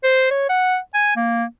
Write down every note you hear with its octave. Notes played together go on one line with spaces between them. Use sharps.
C5
C#5
F#5
G#5
A#3